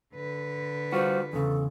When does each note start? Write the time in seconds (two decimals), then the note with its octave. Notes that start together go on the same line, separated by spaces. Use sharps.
0.15 D3 B4
0.92 G3 F4 F#4 C5
1.33 E2 C#3 A4